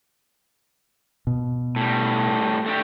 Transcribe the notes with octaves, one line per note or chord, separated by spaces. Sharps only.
B2
A2 G3
A3 D4 G4